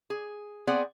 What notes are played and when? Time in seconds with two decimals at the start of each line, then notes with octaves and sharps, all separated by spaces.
0.10 G#4
0.67 B3 C4 G#4 D5 F#5